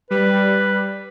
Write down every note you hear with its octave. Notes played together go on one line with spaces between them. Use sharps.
G3 B4